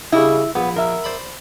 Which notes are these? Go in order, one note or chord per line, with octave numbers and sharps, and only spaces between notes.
C#3 G3 E4 D#5
A#1 B3
A#4 E5
C5 D5 B5